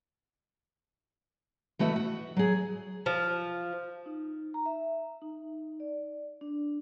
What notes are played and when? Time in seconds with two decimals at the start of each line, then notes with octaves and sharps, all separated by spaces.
1.79 E3 A3 F#4 D#5 E5
1.96 F#4
2.36 F#3 G#4
3.06 F3
4.06 D#4
4.54 A#5
4.66 E5
5.22 D#4
5.80 D5
6.41 D4